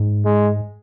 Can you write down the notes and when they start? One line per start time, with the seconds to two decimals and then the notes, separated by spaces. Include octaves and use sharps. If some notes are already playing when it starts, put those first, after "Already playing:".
Already playing: G#2
0.25 G#3